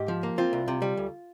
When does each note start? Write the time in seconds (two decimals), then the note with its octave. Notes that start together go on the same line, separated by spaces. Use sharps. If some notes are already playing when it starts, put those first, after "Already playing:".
Already playing: G#2 G4
0.08 F3
0.23 A#3
0.38 C4 F4
0.53 C2
0.68 C3
0.82 G3
0.97 D2